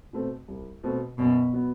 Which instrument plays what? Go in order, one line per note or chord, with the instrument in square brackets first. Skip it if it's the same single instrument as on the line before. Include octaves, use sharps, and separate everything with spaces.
[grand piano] B2 A3 C4
C2
B2 A3 C4
[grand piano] F#2 [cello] B2
[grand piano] F#3 B3